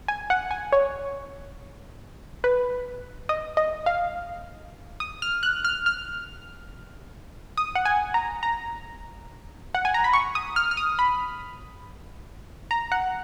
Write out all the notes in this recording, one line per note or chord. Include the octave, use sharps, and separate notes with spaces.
G#5
F#5
G#5
C#5
B4
D#5
D#5
F5
D#6
F6
F#6
F6
F6
D#6
F#5
G#5
A#5
A#5
F#5
G#5
A#5
B5
C#6
D#6
F6
F6
D#6
B5
A#5
F#5